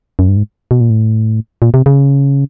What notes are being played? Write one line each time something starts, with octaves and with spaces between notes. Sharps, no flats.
F#2
G2
G#2
B2
A#2
A2
A#2
C3
C#3